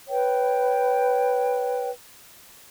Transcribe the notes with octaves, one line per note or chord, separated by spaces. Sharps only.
B4 C#5 G5